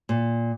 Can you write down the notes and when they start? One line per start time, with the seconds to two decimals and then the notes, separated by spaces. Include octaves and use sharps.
0.09 A#2